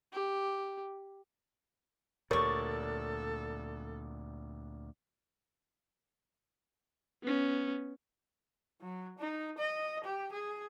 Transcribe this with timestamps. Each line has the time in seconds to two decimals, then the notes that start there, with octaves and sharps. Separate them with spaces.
0.13 G4
2.31 D2 A#2 G4 A4 A#4 C#5 D5 C#6
7.23 B3 C#4
8.81 F#3
9.18 D#4
9.58 D#5
10.04 G4
10.33 G#4